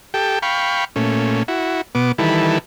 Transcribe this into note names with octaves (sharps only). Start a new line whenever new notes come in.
G4 A4 G5
F5 G5 B5 C#6
A#2 A3 C#4
E4 F#4
B2 B3 D6
D#3 E3 G3 E4 A4 B4